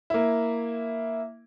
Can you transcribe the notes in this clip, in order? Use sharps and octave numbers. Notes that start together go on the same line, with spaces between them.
A#3 E4